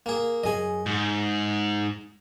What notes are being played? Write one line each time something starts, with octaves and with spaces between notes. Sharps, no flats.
A#3 G#4
F#2 G#4 D#5 G#5
G#2 F#5